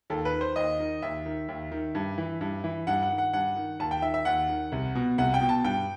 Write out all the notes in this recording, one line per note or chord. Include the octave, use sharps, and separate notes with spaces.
D#2 A4
B4
D#3
C5
D#2 D#5
D#3
D#2 E5
D#3
D#2
D#3
G2
E3
G2
E3
G2 F#5
F#5
D#3
F#5
G2 F#5
D#3
D#2 A5
G5
D#3 E5
E5
D#2 F#5
D#3
C2
B2
C2 F#5
G5
B2
A5
G2 G5